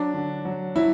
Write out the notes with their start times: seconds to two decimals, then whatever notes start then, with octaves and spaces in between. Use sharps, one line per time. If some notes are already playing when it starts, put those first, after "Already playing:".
Already playing: F#3 D4
0.14 D3
0.45 F#3
0.76 F#3 E4